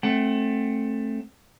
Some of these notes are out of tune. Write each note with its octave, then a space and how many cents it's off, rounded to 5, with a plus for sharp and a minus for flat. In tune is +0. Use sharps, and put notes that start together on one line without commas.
A3 +0 C4 +30 F#5 +40